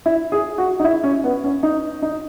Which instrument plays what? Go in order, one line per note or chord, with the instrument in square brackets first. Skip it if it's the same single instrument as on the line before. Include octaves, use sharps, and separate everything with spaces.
[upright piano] E4
G#4
F#4
D#4
E4
C#4
B3
C#4
D#4
D#4